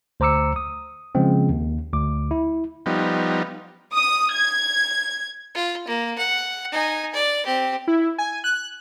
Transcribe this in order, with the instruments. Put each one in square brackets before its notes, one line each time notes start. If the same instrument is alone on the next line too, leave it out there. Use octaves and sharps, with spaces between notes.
[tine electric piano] D2 C5 A#5 D6 E6 C#7
D#6
C#3 F3 G#3 C4
D#2
D2 D6
E4
[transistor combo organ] F3 G3 B3 D#4
[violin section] D#6
G#6
[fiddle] F4
A#3
F#5
D#4 G#5
D5
C4 G4
[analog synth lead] E4
G#5
F#6